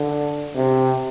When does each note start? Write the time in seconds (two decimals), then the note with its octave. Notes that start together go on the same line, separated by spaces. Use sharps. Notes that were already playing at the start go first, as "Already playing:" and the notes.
Already playing: D3
0.56 C3